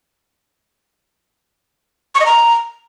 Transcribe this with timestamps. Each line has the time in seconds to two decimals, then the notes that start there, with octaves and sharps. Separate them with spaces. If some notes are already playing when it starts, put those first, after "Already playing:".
2.15 C#6
2.20 D#5
2.26 A#5